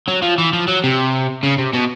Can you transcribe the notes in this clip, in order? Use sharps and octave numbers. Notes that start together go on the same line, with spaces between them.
F#3
F3
E3
F3
F#3
C3
C#3
C3
B2